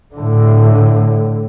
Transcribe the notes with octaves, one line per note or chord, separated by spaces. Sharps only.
A2 D3